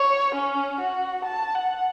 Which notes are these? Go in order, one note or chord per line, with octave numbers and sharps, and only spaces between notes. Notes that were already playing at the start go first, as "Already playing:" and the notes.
Already playing: C#5
C#4
F#4
A5
F#5